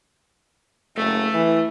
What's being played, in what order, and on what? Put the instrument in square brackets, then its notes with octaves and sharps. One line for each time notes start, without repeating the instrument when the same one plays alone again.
[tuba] F#1 [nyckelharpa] A3
[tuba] E3